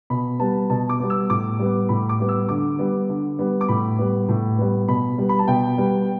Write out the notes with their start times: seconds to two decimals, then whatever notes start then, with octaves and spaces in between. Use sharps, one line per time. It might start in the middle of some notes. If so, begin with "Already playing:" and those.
0.10 B2 B5
0.39 G3 B3 A5
0.70 B2 A5
0.89 D6
1.00 G3 B3
1.10 E6
1.30 A2 D6
1.59 G3 B3
1.89 A2 B5
2.09 D6
2.20 G3 B3
2.29 E6
2.49 D3 D6
2.79 G3 B3
3.09 D3
3.39 G3 B3
3.61 D6
3.69 A2 B5
3.99 G3 B3
4.29 A2
4.58 G3 B3
4.88 B2 B5
5.18 G3 B3
5.29 B5
5.39 A5
5.48 B2 G5
5.78 G3 B3